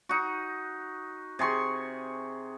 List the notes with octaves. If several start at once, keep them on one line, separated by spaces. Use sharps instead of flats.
D#4 F#4
C3 G#4 C6 C#6